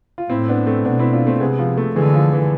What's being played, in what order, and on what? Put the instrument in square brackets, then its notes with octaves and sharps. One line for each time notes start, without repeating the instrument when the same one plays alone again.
[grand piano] F4
[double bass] A2 [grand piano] C4 E4
[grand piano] B3 D4
A3 C4
[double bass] B2 [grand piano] B3 D4
[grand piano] C4 E4
D4 F4
A3 C4
[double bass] C3 [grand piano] G#3 B3
[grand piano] F3
F3 A3
[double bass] D3 [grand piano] E3 G#3
[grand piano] F3
E3